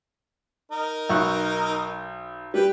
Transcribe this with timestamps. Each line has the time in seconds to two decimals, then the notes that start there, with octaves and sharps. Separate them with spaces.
0.72 D#4 A#4
1.09 B1 C#6 F#6
2.54 G3 B4 G5